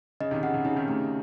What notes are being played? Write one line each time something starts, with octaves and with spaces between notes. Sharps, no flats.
C#3 D#5
C3 D#3
C#3 F#5
C3
C#3 D#4
C3 D#3
C3 A3